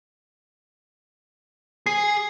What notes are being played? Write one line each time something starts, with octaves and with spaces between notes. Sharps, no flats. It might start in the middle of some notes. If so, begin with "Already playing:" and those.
G#4 C7